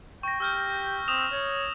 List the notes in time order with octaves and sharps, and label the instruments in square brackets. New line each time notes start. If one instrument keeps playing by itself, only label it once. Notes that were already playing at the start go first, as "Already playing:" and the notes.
[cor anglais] G5 [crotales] C#6 A#6
[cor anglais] G4 [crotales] E6 F6 G6
[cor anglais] C4 [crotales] D#6 E7 F7
[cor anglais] C#5